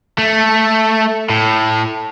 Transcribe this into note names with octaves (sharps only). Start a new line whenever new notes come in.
A3
A2